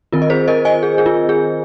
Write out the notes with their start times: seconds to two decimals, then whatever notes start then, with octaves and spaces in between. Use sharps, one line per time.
0.13 D#3 C4 F4 A#4
0.22 D#5
0.30 G#4 C5
0.48 A#4 D#5
0.65 D#5 G#5
0.83 G#4
0.98 G#4
1.06 F4
1.29 G#4